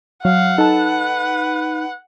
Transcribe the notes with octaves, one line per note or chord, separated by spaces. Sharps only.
F#3 F5 F#5
D#4 A4 B4 A5